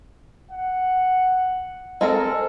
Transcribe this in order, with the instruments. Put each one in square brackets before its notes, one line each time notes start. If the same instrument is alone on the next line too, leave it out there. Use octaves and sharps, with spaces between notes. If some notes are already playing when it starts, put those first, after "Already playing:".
[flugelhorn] F#5
[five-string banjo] G#3 C4 A#4 [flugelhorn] A4